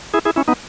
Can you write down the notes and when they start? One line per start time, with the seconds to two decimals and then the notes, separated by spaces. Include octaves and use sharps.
0.14 E4 G#4
0.25 E4 G#4
0.36 C#4 E4
0.48 B3 D#4